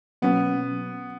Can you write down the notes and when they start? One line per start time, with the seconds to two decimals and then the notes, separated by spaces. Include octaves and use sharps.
0.22 B2 F#3 A#3 B3 C#4